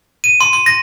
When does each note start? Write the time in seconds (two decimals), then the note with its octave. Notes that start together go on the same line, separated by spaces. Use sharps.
0.24 D#7
0.41 C6
0.53 C6
0.66 A#6